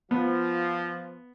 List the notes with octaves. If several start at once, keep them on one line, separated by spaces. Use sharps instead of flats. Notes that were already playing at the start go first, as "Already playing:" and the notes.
F3 B3